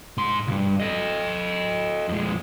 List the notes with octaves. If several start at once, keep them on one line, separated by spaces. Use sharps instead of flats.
G#2 C6
C#2 G2
A4 D#5
F2 G#3